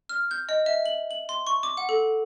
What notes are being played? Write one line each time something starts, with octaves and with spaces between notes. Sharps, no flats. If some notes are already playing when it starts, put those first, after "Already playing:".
F6
G6
D#5
E5
F#7
F#7
C6
C#6
D6
F#5
A4